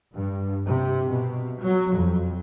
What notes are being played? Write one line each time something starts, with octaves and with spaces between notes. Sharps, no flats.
G2
C3
B2
F#3
F2